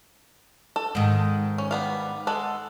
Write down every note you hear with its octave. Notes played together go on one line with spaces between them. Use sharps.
A4
G#2 D#3
C#4
G3 B3 F5
G#3 A4 F#5